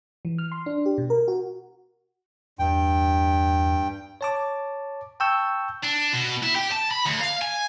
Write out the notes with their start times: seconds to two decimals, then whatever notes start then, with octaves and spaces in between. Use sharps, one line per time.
0.25 E3
0.38 F6
0.52 C6
0.66 D4
0.86 G4
0.98 B2
1.10 A#4
1.28 F#4
2.59 E2 G2 G5
4.21 C#5 A5 D6
5.20 G5 A5 C#6 E6 G6
5.84 D4
6.13 B2
6.43 E4
6.55 G4
6.71 A5
6.91 B5
7.06 D2
7.21 F5
7.42 G#5